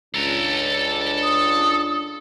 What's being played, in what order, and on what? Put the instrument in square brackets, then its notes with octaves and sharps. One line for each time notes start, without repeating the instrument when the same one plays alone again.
[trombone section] C#2 D4 [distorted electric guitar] A4 A#5
[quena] D#6